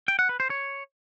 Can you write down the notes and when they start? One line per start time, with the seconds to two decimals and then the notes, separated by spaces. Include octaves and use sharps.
0.08 G5
0.19 F#5
0.29 B4
0.40 C5
0.50 C#5